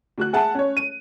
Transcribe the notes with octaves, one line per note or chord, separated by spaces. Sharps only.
D2 F#4 F#6
G#4 E5 F#5 A5
C#4 C#5
D#7